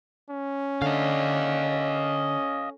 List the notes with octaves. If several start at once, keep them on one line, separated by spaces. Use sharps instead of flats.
C#4
D3 D#5 F5